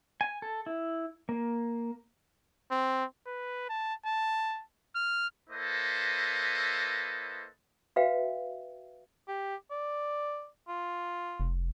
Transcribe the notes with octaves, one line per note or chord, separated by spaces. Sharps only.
G#5
A4
E4
A#3
C4
B4
A5
A5
F6
A#3 E4 A4 B4 C5 D#5
F#4 B4 E5 F5 G5
G4
D5
F4
F1